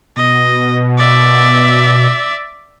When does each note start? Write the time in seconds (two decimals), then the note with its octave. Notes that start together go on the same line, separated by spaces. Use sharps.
0.17 B2 D#5
0.98 D5 E5